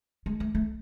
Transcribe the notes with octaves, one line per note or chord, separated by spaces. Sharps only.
G#3
A3
A3